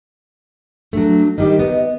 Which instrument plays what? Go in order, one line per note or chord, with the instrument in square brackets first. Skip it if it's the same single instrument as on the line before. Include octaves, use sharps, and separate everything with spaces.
[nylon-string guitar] F#3 A3 [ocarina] D4
[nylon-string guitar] D#3 G3 G4 [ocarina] D#5
[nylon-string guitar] B3